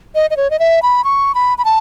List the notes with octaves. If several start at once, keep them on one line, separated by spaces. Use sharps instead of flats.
D#5
D#5
C#5
D#5
E5
B5
C#6
B5
B5
A5